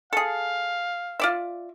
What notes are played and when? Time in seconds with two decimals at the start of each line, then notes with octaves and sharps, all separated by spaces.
0.13 G#4 A4 F5
1.20 F4 D5 E5